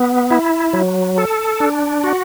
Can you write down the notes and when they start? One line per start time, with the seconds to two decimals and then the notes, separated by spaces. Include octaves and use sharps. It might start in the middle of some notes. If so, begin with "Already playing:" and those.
Already playing: B3
0.31 E4
0.73 F#3
1.18 A4
1.60 D4
2.04 F#4